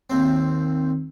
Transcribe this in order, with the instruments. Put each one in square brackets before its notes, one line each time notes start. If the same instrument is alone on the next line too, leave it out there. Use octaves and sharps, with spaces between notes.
[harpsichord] D#2 C4